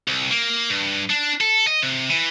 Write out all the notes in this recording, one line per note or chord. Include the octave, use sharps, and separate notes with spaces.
C2
A#3
G2
D4
A4
D#5
C3
E3